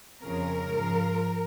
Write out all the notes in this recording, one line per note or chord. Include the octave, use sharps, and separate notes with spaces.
F2 C#3 F3 A#4
G#2 F3